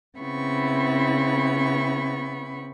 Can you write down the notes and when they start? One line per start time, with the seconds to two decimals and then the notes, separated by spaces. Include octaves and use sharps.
0.19 C#3 B3 C4 E4 B5 C#6